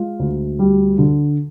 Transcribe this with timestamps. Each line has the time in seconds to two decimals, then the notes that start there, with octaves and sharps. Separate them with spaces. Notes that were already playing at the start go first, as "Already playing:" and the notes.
Already playing: G#3 F4
0.20 D2
0.59 G3
0.98 D3